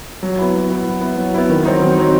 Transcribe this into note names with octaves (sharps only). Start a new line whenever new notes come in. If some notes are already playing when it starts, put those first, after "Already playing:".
F#3
B3 E4
F#3
B3 E4
F#3
B3 E4
F#3
B3 E4
D#3
F#3 C4 D#4
D#3
F#3 C4 D#4